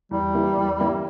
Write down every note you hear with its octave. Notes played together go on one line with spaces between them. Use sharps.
E2 G3
E3 A#3 E4 G4
E2
E3 A#3 E4 G4